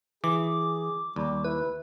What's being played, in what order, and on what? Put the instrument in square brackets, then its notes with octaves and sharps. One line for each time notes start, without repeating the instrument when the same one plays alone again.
[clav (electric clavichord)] E3 [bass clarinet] G#4 [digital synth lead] D6
[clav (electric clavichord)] D#2 [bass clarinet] G3
[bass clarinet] E4 [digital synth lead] B4